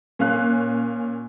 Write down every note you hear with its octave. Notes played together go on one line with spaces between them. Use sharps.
A#2 C#4 F5 F#6